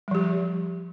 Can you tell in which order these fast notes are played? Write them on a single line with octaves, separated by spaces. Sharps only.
G3 F3 G4